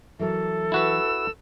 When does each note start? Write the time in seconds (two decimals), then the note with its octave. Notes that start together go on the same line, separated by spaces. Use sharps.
0.19 E3 F#3 A4 A#4
0.72 E4 F#4 B4 E6